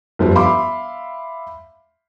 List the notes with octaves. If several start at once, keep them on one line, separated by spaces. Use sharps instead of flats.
G1 F3 G3
E5 F5 B5 C6 D6